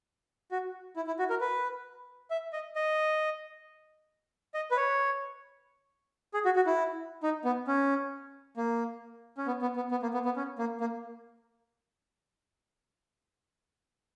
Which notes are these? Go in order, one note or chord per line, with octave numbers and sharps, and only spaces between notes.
F#4
E4
E4
F#4
A#4
B4
E5
D#5
D#5
D#5
B4
C#5
G#4
F#4
F#4
E4
D#4
B3
C#4
A#3
C#4
B3
B3
B3
B3
A#3
B3
B3
C#4
A#3
A#3